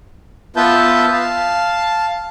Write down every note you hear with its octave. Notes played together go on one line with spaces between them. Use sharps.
B3 F4 B4 E5 A5 G6
F5 A5